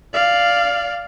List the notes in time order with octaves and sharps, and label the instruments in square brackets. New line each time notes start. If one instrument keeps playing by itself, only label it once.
[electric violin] D5 F5